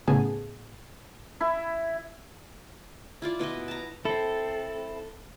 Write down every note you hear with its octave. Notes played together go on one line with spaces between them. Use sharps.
A2 C#3 B3 G#4 G#5 A5
E4 E5
E4 F4 D5
B2 E4 B4 D#5
A5 A#5
C4 E4 A4